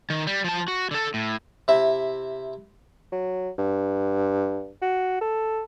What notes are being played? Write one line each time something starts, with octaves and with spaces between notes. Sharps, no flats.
D#3
G3
F3 A5
F#4
D3 A4
A2
C3 E4 E5
F#3
G2
F#4
A4